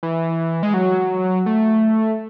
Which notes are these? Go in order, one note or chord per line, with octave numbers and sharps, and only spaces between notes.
E3
G#3
F#3
A3